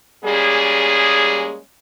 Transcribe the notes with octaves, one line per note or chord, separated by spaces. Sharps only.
G3 G#3 A#3 C#4 G#4